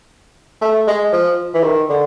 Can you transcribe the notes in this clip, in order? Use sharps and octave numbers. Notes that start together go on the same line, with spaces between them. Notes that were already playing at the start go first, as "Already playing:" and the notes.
A3
G#3
F3
E3
D#3
D3